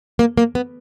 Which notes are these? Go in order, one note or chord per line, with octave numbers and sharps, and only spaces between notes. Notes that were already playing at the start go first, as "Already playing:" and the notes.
A#3
A#3
B3